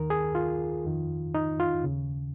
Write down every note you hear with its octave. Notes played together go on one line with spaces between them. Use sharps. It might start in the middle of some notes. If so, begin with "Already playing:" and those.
Already playing: D#2 D#3 A#4
G#4
F4
F2 D#3
D#4
F4
D#2 C#3